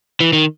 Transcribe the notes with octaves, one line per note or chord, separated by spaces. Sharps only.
E3
D#3